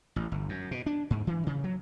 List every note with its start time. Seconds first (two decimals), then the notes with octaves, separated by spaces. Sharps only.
0.16 A1
0.32 G1
0.49 F#2
0.71 B2
0.86 D4
1.10 G#2
1.27 E3
1.47 C#3
1.64 F#3